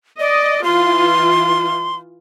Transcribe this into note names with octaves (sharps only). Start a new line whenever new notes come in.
D5 D#5
E3 F4 C6